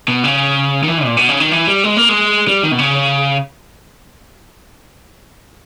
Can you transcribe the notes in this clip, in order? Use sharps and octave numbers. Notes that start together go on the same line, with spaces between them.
B2
C#3
D#3
E3
A#2
B2
C#3
D#3
E3
G3
G#3
A#3
G#3
G3
D#3
B2
C#3